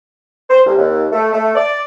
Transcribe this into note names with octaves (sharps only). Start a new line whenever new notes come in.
C5
C2
D#2
A3
A3
D5